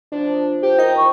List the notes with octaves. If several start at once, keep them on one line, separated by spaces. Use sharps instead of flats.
C3 F3 A#3 D4
A4 D#5
G4 C5
D#4 A#4 G5
E3 C#6